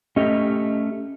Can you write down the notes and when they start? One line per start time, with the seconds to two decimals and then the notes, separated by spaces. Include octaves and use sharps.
0.16 A3 C#4 G4 D#5